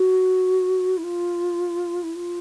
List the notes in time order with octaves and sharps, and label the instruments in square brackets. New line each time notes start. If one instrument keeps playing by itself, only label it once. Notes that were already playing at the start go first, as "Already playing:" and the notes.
Already playing: [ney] F#4
E4
F4
E4
F4